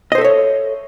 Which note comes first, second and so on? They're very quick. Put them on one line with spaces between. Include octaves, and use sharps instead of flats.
D#5 C5 A4 E5 C#5